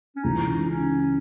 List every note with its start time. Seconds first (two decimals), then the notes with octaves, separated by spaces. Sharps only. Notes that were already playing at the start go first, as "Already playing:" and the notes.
0.16 C#4
0.24 C#2 C#3 E3 D#4
0.69 C#4